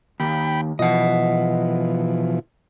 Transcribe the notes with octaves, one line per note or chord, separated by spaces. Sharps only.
D#2 G5 B5
B2 E3 F3 D#5 F#5